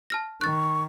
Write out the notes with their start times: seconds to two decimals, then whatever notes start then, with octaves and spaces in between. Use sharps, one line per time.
0.10 A5 F6 A#6
0.41 D#3 C#6 F#6 A6